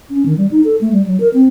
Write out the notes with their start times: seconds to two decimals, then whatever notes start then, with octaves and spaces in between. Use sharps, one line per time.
0.10 C#4
0.26 D#3
0.38 G3
0.51 D#4
0.64 A4
0.81 A3
0.93 G3
1.06 F#3
1.20 A#4
1.34 C4